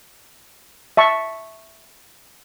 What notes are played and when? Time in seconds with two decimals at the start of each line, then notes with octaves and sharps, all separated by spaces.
0.97 E5 A5 C#6